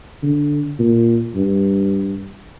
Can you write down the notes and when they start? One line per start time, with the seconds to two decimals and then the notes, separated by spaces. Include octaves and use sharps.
0.23 D3
0.79 A#2
1.35 G2